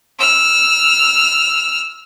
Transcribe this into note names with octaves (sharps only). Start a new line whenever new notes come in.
E6 F6